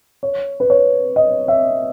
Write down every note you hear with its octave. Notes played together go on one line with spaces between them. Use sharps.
C#5
B4
C#5
D#5
E5